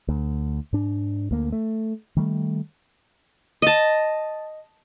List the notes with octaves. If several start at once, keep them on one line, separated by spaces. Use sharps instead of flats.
D2
G#2 D4
D2 A#3
A3
D#3 G3 A3
D#5 A5